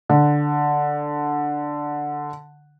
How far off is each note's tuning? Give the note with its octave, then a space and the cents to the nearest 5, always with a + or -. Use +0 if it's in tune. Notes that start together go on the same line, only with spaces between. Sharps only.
D3 +5